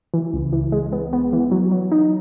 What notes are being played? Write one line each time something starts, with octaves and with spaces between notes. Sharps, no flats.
E3
C#2
E3
G#3
B3
B3
E3
F#3
F#3
D#4